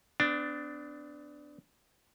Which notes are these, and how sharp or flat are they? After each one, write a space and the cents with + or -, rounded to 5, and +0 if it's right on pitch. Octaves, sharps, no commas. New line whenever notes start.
B3 +40 D4 +0